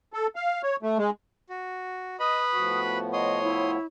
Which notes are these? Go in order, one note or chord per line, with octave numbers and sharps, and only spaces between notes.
A4
F5
C#5
A3
G#3
F#4
B4 D#5 B5 D#6
A2 F3 B3 F#4
C#5 D#5 C6 D#6
E4